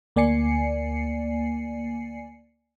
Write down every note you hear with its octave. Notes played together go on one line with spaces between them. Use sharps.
D2 A#3 D5 G#5 C7 C#7